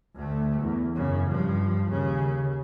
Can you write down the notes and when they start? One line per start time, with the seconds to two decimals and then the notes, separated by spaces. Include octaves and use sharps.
0.15 D2 A3
0.61 E2
0.95 F#2 C#3
1.27 G2 F3
1.90 D#2 C#3